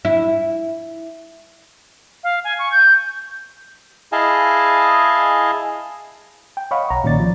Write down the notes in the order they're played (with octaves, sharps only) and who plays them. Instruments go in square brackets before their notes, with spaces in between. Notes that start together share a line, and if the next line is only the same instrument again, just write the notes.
[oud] E4
[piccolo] F5
G#5
C#6
G6
[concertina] E4 G#4 D#5 F5 G#5 A5
[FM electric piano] G5
C#5 D#5 F5 F#5 B5 C#6
B1 C#5 A#5
A#2 D#3 C#4 D5 A6
F3